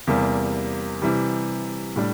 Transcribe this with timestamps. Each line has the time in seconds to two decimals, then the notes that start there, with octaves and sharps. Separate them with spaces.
0.07 E2 C3 G3 A#3
1.02 C3 E3 G3
1.96 A2 G3 D4